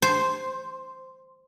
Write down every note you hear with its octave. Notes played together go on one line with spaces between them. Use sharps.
C5